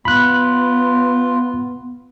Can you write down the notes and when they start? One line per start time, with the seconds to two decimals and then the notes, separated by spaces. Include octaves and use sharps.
0.05 B3 F4 B5 F#6